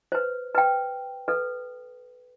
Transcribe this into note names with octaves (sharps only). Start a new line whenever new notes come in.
B4 C5
B4 G5
A4 B4